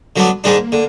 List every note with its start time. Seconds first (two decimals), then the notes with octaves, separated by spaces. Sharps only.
0.16 D3 F#3 G#3 B3 D4
0.44 G#2 D#3 G#3 A#3 D4
0.72 D3